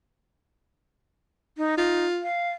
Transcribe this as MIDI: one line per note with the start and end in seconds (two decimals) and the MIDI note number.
1.57 1.75 63
1.77 2.05 63
1.77 2.25 65
2.23 2.51 77